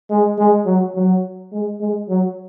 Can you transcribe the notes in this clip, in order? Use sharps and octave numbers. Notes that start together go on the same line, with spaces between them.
G#3
G#3
F#3
F#3
G#3
G#3
F#3